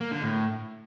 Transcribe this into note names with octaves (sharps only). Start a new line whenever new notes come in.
A#3
D3
A2